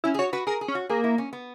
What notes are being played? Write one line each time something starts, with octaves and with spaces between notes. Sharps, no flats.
C#4 E4
G#4
F#4 C#5
F#4 B4
G#4 A#4
G#4
C#4
F#4
A#3 G#4
E4
C#4
B3